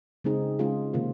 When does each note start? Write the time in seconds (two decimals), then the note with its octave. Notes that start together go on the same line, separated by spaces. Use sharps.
0.24 C#3 G#3 C4 D#4 G#4
0.59 G#3 C#4 F4 G#4
0.93 C3 D#3 A#3 F4 C5